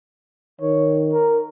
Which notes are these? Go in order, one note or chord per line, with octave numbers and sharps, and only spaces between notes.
D#3 C#5
A#4